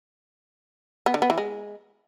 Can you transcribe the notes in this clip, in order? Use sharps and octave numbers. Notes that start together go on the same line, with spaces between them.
B3
D3
B3
E3
G#3